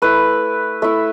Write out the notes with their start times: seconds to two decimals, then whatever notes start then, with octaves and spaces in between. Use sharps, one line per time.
0.02 A3 E4 B4
0.82 A3 E4 E5